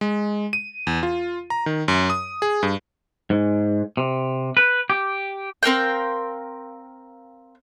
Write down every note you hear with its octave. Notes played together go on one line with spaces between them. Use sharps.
G#3
D#7
E2
F4
A#5
D#3
F#2
D#6
G#4
G2
G#2
C3
B4
G4
C4 A#4 F5 G5